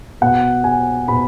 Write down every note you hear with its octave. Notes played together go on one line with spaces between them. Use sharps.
B2 B3 F#5
G#5
B2 B3 B5